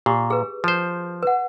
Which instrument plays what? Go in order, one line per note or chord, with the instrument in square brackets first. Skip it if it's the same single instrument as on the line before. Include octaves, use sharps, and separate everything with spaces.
[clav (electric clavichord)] A#2 [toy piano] G4
[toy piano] G#4 B4
[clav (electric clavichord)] F3 C5
[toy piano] B4 F#5